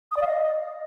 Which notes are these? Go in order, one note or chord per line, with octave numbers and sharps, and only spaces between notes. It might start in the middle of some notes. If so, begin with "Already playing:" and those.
D#6
D5
F5
D#5